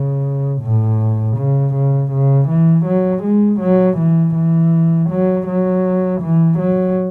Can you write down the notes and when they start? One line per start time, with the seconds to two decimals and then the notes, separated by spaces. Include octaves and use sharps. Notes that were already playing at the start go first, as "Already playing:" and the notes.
Already playing: C#3
0.62 A2
1.37 C#3
1.74 C#3
2.11 C#3
2.48 E3
2.86 F#3
3.23 G#3
3.60 F#3
3.98 E3
4.34 E3
5.10 F#3
5.47 F#3
6.21 E3
6.59 F#3